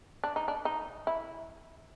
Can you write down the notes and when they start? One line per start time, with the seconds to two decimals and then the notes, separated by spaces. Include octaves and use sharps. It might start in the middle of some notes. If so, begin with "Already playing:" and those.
0.24 D4
0.36 D#4
0.48 D4
0.65 D#4
1.07 E4